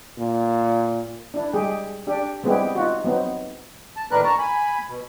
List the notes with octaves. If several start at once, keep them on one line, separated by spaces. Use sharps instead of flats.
A#2
D4 E4
G3 G#3 G4 G#4
D4 G4
G3 G#3 B3 C4 E4 G4
D#4 F4 F#4
F#3 B3 C4 D#4
A5
A2 D#3 D4 A#4 B4 F#6
A5 A#5 C#6
G#5 B5
B2